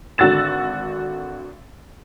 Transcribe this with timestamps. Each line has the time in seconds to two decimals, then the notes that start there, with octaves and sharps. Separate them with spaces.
0.18 G#1 D3 F#4 E6 A6 E7